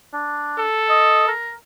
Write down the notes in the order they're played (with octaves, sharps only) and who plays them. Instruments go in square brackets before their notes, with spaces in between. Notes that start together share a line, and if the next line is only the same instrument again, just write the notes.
[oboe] D4
[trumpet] A4
[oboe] D#5
A#4